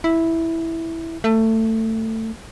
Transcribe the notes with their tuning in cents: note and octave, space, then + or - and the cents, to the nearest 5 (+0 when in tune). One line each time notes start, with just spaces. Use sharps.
E4 -5
A3 +20